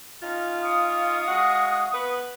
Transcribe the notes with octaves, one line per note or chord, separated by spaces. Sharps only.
C#4 D#4 F4
F5 C#6 D#6
G#3 F#4 F#5
B3 B4